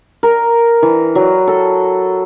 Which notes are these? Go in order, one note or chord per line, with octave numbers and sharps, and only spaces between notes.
A#4
E3
F#3
A4